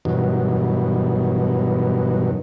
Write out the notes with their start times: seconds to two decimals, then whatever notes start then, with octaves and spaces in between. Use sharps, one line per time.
0.05 E2 G2 B2 D#3 F#3